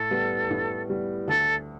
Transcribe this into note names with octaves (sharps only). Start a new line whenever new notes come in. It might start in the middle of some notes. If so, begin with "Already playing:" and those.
Already playing: A2 A4
G3 B3
A2
G3 B3
D2 A4